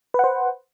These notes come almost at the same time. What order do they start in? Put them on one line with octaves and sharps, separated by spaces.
B4 F#5 C5